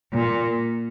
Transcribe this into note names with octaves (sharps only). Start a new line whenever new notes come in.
A#2